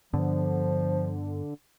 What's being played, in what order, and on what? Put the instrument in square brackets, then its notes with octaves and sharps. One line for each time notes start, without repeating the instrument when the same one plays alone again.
[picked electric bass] G2 B3 [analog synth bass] D3 [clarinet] F3